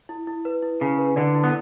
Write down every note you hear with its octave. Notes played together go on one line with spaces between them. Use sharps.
E4
E4
B4
E4
C#3 E4
B4
D3 D5
E4
B3